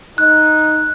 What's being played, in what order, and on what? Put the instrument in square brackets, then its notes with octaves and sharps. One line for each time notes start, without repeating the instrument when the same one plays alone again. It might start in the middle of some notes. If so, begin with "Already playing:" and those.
[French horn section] D#4 [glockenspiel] F#6